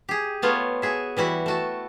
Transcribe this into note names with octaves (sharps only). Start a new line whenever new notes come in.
G4 G#4
A3 B3 F4 C#5
F#4 G#4 E5
E3 G3 E4 F#4
A3 F#4 A5